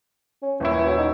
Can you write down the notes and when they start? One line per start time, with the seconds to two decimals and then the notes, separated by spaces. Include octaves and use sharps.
0.42 C#4
0.60 D#1 E3 C#4 E4
0.86 F#3
0.98 D#4